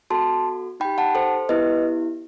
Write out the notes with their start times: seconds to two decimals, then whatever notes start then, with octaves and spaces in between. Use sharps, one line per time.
0.10 B3 F#4 A4 A5 C6
0.80 D#4 G5 B5
0.85 G4
0.98 F#5 A5
1.15 A4 C5
1.49 B3 E4 G4 B4 D#5